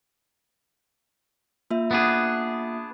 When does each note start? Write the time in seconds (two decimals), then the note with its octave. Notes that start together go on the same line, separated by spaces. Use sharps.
1.70 A#3 F4 E5
1.91 B3 D4 G#4